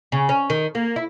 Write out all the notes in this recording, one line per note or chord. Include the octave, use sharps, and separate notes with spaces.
C#3
C#4
D#3
A#3
E4